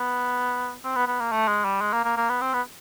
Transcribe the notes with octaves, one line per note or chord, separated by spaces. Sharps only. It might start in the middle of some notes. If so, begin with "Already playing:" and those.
Already playing: B3
C4
B3
B3
A#3
A3
G#3
G3
G#3
A#3
A#3
A#3
B3
C4
B3